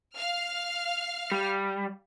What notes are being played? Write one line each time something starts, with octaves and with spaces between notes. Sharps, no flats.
F5 F6
G3